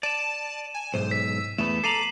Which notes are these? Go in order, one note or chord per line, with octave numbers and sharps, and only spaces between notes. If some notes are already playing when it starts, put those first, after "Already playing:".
D5 A5 D#7 E7
G#5
B1 G#2 C5
E6 B6
E2 A3 B3 E7
A4 A#5 D6 C7 D#7 F#7